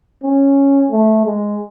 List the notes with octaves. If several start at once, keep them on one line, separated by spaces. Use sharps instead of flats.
C#4
A3
G#3